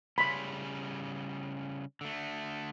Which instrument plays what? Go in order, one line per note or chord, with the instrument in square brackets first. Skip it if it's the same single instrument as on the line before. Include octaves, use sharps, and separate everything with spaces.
[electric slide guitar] C#3 G3 C#4 [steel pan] B5 C6
[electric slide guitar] D3 A3